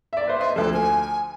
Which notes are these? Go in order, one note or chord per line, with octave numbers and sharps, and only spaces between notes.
D5 E5
B4 C5 E5
D#5 E5 C6
D2 F3 A4
G#5